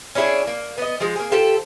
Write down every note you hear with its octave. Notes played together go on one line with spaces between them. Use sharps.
C#4 D4 E4 G#4
A#3
B3 D#5
F3 G#3
A#3 G#4
F4 G4 A4 C5